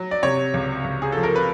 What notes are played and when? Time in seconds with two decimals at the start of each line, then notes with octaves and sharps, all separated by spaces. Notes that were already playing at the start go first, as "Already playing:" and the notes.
Already playing: F#3
0.11 D5
0.23 C3 C#5
0.54 C#2
0.84 C#2
1.02 G#4
1.12 F3 A4
1.23 A#4
1.35 B4